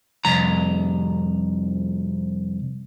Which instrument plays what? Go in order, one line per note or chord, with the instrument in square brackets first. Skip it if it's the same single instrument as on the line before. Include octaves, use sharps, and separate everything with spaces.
[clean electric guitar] C2 F2 A#5